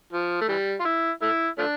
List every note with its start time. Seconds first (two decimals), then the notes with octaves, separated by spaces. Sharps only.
0.13 F3
0.41 A3
0.49 E3 G3
0.80 F4
0.85 E4
1.22 A3 E4
1.58 F3 A3 D4